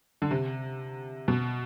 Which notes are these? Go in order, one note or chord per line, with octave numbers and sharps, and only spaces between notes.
D3
C3
B2